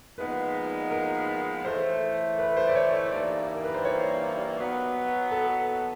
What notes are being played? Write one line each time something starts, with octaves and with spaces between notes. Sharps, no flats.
A#2 F3 G#3 B3 D#4 B4
A#4
A2 E3 A3 C5
B4
C5
D5
C#5
G2 E3 G3 A#3 D#4 D5
A#4
B4
C5
C#5
B2 F#3 B3
A4